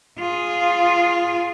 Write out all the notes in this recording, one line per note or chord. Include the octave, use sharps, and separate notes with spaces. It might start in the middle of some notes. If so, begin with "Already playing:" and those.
F4 G#4